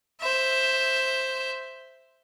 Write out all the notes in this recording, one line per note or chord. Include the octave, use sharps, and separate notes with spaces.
C5 E5